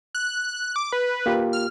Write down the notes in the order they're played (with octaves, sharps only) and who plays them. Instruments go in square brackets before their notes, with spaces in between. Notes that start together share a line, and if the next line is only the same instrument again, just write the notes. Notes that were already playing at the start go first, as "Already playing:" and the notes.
[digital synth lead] F#6
D6
B4
[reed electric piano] A#3 F4 G4
[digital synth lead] F6